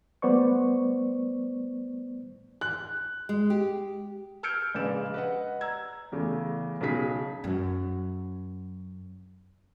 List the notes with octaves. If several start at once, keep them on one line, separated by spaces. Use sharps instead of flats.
G3 A3 B3 C5 D5 C#6
F#6
G#3
G4
E6 F6 G6 G#6 C#7 D7
A#1 C#3 G#3 B4 D5 E7
B4 D#5 F#5
A#5 E6 G#6
E2 C#3 A3
B1 C#3 G#4 B6
F#2 F#3